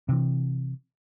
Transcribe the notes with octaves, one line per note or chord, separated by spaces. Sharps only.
C3 E3